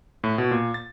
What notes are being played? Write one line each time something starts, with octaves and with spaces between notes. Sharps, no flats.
A2
B2
A#2
A6